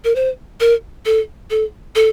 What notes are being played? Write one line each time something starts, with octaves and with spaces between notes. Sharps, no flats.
A#4
C5
A#4
A4
A4
A4